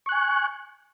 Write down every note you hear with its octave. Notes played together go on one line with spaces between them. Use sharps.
G#5 C#6 F#6